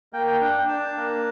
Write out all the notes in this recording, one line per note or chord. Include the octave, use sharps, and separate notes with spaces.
A#3 G5
G5
D4 G5
G5
D4 A5
A#3